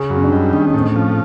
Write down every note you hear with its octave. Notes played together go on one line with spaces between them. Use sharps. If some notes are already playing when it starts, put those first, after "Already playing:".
Already playing: C#3 G#4
F#2
C#4
D4
G3 D#4
D#3 D4
C#4
A2 C4
C#4
F3